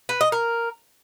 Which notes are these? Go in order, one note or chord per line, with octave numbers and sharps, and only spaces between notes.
B4
D#5
A#4